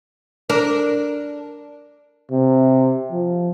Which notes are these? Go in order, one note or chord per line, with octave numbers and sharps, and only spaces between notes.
D4 A#4
C3
F3